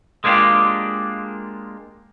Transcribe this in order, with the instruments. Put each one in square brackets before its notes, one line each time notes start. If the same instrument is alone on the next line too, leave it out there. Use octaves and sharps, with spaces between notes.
[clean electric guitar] G#3 A#3 D4 F4 G4